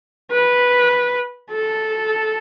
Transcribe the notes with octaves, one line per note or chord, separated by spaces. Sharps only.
B4
A4